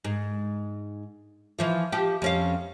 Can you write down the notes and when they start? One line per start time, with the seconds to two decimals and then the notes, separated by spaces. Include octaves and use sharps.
0.05 G#2
1.59 E3 F3 F4
1.92 F3 G4
2.22 F2 C#4 F5